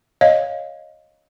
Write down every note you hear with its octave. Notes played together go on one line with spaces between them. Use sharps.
C#5 D#5 F5